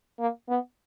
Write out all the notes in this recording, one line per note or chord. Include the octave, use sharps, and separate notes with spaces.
A#3
B3